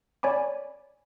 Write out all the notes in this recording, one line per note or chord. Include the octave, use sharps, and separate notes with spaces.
C#5 D5 G#5 B5 D6